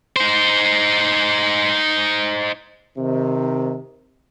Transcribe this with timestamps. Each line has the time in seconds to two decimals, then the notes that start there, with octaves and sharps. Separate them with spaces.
0.16 D#4 C5
2.97 C3 D#3